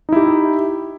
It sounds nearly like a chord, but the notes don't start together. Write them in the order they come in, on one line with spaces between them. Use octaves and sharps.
D#4 E4 G4